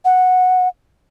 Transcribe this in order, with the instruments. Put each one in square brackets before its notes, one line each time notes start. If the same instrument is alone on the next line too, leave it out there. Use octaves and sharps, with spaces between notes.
[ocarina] F#5